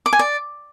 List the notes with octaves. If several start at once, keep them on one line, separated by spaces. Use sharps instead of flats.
D6
G#5
D5